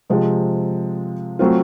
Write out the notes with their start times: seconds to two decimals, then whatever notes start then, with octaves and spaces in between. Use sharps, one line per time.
0.10 C3 F3 G#3 C4
1.39 F#3 A3 C4 F4